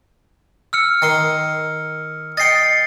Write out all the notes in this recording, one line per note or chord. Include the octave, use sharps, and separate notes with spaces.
E6 F6 C#7
D#3 C6
D#5 G5 A6 C7 C#7